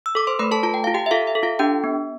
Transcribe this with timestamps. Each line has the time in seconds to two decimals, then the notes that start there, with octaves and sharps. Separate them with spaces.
0.06 E6
0.15 A4 D6
0.27 C5 C6
0.39 A3 B4 B5
0.51 A4 A5
0.63 F4 A5
0.74 G5
0.84 F4 F5
0.94 G4 G5
1.06 E5
1.11 F4 A4 F5
1.27 E5
1.35 A4
1.43 F4 F5
1.59 D4 G4 G5
1.84 B3